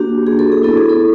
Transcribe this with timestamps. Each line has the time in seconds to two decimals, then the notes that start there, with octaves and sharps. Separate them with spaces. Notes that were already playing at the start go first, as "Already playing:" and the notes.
Already playing: A#3 D4 F#4 G4
0.27 G#4
0.39 A4
0.52 G#4
0.63 B3 E4 A4
0.77 G#4
0.89 A4